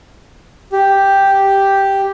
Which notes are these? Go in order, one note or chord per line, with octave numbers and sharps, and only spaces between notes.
G4